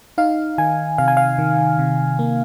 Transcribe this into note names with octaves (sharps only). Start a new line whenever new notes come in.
D#4 F5
D#3 G#5
C3 F5
G#5
F5
D#3
C3
A#3